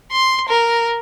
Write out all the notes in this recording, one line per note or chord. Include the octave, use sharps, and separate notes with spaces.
C6
A#4